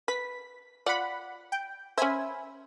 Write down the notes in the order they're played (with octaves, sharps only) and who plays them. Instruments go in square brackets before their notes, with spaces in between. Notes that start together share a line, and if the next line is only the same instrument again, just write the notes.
[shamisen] B4 [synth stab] B6
[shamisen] F4 D5 [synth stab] F#5 B5
[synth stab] G5
[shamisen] C#4 C5 [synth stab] E5 G#5 B5